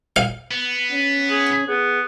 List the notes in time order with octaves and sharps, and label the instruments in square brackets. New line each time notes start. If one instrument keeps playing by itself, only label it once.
[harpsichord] F5
[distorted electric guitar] B3
[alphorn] C#4
[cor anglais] G#4
[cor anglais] B3 [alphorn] G#4